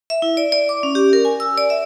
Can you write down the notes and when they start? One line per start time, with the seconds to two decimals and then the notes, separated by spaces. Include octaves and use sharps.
0.10 E5
0.22 E4
0.37 D5
0.52 D5
0.69 D6
0.83 C#4
0.95 G4
1.13 A#4
1.25 G#5
1.40 E6
1.58 D5
1.70 E5